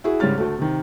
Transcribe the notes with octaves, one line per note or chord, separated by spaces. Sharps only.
E4 F#4 G#4
G#2 C#3 G3 C#5 F6 A6
D2 A3
C3 D#3